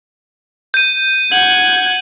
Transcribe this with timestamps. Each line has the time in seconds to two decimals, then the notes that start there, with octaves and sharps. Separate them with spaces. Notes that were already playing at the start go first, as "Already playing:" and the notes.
0.74 G6 D#7
1.32 F#5 G#6 F#7